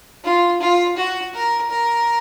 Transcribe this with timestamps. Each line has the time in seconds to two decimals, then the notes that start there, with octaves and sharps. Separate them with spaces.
0.24 F4
0.61 F4
0.97 F#4
1.34 A#4
1.71 A#4